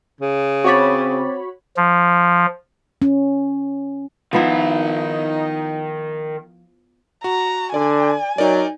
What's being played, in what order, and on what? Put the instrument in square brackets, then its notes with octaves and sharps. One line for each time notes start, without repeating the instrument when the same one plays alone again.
[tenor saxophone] C#3
[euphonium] C4 [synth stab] F#4 C#5 B5 [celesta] C#6 D6 A6
[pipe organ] F3
[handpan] C#4
[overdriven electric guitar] D#3 B5 [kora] F3 B3 E4 [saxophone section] D#4
[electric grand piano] F#4 [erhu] A#5
[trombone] D3 [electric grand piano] D5 [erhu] G#5
[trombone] F#3 [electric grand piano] D#4 A#4 D5